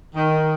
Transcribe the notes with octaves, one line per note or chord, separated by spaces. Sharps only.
D#3